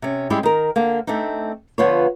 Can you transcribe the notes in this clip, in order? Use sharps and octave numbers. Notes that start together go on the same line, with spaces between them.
C3 C#4
G3 G#3 C4 C#4 E4 G4
D#3 A#4
D3 A#3
A3 C4 D4 D#4
D3 F3 B3 F4 B4 C#5